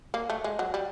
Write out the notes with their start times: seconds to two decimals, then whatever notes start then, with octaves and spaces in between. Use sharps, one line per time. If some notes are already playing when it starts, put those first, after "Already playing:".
0.14 A#3
0.30 A3
0.44 G#3
0.59 F#3
0.74 G3